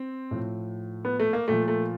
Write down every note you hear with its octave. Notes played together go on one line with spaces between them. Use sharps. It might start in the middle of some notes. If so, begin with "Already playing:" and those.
Already playing: C4
A2 F3
B3
A3
A#3
A#2 F3 A3
A3